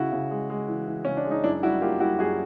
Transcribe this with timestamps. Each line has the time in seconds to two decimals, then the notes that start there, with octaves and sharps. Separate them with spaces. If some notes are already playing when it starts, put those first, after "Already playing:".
Already playing: C#3 E4 F#4
0.12 C#3
0.31 G#3
0.50 G#3
0.68 E3
0.87 E3
1.05 C#3 C#4
1.17 D4
1.25 G#3
1.31 D#4
1.44 F#2 D4 E4
1.63 G3 E4 F#4
1.81 A#3 F4 G4
2.00 G3 E4 F#4
2.19 F#2 F#4 G#4